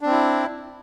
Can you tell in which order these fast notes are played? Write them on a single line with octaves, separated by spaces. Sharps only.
D4 C4 E4